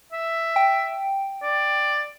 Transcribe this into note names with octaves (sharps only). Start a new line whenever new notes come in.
E5
G5
D5